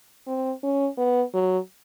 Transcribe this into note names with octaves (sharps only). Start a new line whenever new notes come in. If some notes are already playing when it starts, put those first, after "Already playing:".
C4
C#4
B3
F#3